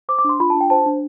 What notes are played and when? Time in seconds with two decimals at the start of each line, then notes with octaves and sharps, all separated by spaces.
0.09 C5 D6
0.19 D6
0.24 D4 C6
0.40 F4 B5
0.50 D4 A5
0.61 G5
0.70 C5 A5
0.86 D4